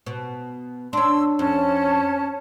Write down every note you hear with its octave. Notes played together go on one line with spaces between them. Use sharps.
B2
C#4 D4 C6 E6
F2 C#4 A5